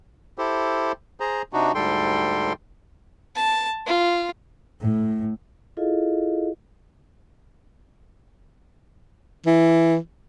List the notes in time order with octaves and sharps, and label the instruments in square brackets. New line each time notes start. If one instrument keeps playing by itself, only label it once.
[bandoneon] E4 G4 A4 C5
G#4 C5 A#5
C3 D4 D#4 F#4
D2 G#2 G3 A4 G5 C6
[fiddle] A5
F4
[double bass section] A2
[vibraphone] E4 F4 G#4 A4 D#5 F5
[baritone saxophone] E3